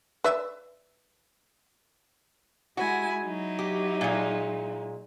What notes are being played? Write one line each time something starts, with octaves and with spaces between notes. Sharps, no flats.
B4 D5 E5
G#3 E4 F#4 G#5
F#3 D#4 E4
G4
A#2 G#3